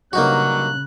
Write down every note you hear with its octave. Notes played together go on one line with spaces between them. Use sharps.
G2 C#3 F#3 A#3 D#4 F#4 F#6